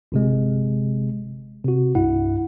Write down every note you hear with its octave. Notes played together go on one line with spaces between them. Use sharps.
G1 C3 G#3
C3 F#4
C2 G2 E4 F#5